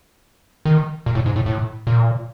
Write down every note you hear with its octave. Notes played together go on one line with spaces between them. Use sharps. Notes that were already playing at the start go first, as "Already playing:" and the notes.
D#3
A#2
A2
G#2
A2
A2
A#2